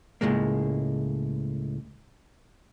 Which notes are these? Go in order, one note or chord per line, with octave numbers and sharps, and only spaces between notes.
C#2 A2 C3 G#3 A#3